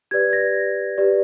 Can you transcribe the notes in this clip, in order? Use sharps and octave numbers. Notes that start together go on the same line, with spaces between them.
G4 B4 D5 G#6
A#6
G4 B4 D5